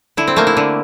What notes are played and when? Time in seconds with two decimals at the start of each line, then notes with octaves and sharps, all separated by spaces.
0.17 D3 E4
0.28 C4
0.36 A3 A#3
0.47 E4
0.57 D3